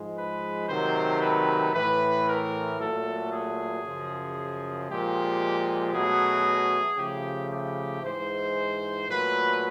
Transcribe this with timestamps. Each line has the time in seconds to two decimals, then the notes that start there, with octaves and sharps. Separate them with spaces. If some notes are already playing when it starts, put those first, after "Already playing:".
Already playing: G#2 F3 G#3
0.16 B4
0.68 C3 D#3 F#3 A3 C5
1.21 B4
1.73 A2 E3 A3 B4
2.27 A#4
2.79 A#2 F#3 A3 A4
3.31 G#4
3.83 F#2 C#3 F3
4.89 A#2 F3 G#3 G4
5.93 B2 F#3 A3 G#4
6.98 C#3 F3 A3 G4
7.51 G4
8.03 G#2 E3 G#3 C5
9.09 A#2 F#3 A3 B4